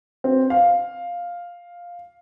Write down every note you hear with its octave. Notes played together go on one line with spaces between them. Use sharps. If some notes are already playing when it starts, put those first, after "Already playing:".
C4
F5